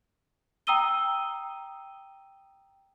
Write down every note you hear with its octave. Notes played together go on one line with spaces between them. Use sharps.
G5 A#5 D#6 E6 D#7 G7